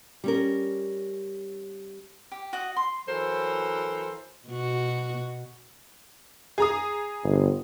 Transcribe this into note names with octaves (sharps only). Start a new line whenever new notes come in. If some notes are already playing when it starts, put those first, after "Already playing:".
G3 C#4 A#4
G4
F#4 D#5 F#5
C6
E3 F#3 A4 A#4 C5
B2 F#4
G#4 A#5 D#6
G1